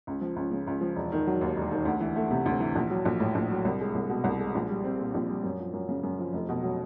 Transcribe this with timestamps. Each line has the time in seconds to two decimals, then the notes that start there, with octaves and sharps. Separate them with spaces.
0.07 C#2
0.21 F3
0.36 C#2
0.51 C#3
0.67 C#2
0.81 F3
0.96 E1
1.12 D#3
1.27 F#3
1.41 D#2
1.57 E1
1.71 D#3
1.85 D2
2.00 E3
2.16 A3
2.30 C3
2.46 D2
2.60 E3
2.75 A#1
2.90 F#3
3.05 A#1
3.20 A2
3.35 A#1
3.51 F#3
3.65 C2
3.80 G#3
3.95 C2
4.10 B2
4.24 C2
4.39 G#3
4.55 A#1
4.69 G3
4.84 C4
4.99 A#2
5.14 A#1
5.30 G3
5.43 F#2
5.59 F3
5.73 F#2
5.89 C#3
6.03 F#2
6.19 F3
6.33 F1
6.49 B2
6.63 F#3